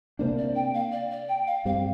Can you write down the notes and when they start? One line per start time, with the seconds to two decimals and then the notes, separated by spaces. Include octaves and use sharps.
0.19 C3 A#3 D4 C5
0.38 D5
0.55 G5
0.74 F5
0.92 D5
1.10 D5
1.28 G5
1.47 F5
1.65 G2 G3 C4 F5